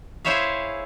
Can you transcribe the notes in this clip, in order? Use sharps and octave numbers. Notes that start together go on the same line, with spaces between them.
E4 G#4 C5 C#5 E5 F5